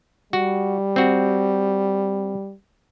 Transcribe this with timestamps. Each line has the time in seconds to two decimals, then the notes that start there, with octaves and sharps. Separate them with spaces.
0.33 G3 F#4
0.96 C4 F#4